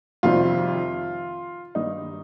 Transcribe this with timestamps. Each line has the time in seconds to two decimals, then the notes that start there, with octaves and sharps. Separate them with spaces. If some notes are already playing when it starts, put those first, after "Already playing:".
0.23 F2 C3 D#3 G3 F4
1.75 G2 D#3 G3 D#4